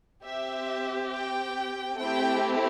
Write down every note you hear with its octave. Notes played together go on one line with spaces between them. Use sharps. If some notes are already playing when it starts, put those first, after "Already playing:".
C4 G4 E5
G5
A3 C4 E4 G4 G5